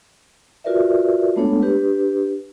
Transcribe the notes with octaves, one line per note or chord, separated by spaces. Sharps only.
F4 F#4 A#4 B4 D5 E5
G#3 A3 B3 D4 A4 C#5
D4 G4 B4